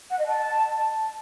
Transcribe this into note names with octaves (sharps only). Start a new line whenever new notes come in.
F#5
D#5
A5